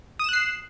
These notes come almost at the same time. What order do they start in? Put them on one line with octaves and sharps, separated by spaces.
D#6 E7 F#6 C7